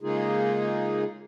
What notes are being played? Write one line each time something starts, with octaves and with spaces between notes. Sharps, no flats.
C#3 G#3 A#3 D#4 F4 G#4